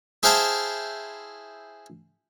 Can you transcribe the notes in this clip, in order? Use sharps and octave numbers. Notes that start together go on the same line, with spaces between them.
E4 G#4 C5 F5 G5 A5